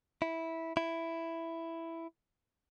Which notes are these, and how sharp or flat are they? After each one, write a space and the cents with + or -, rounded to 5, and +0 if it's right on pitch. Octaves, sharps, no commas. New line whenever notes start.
E4 -10
E4 +5